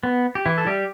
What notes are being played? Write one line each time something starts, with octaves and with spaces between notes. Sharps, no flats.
B3
G4
E3 E4
A4
G3 G4